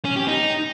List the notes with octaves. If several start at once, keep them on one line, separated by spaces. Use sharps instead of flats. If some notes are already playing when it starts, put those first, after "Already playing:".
C#4
G4
D#4